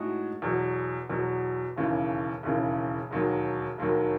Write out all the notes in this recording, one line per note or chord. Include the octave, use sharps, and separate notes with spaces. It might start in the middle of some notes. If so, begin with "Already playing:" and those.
Already playing: A2 G#3 D#4 F#4
E2 B2 F#3
E2 B2 F#3
E1 D#2 C#3 E3
E1 D#2 C#3 E3
E1 D#2 D#3 F#3
E1 D#2 D#3 F#3